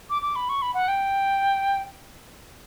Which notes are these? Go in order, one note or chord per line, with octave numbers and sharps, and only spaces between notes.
D6
D6
B5
C#6
B5
F#5
G5